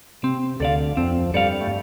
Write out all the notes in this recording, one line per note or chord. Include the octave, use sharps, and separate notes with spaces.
C3 C4
D2 D3 A4 D5 F5
F2 F3 C4
G2 G3 A4 D5 F5
A3